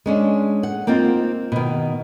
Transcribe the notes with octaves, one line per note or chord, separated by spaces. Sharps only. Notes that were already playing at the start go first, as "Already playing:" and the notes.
G#3 C#4 D4
F#5
A#3 C4 D#4 F4
B2 D#3